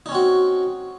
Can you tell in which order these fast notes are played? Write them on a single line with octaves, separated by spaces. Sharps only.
D#4 C#4 C4 F#4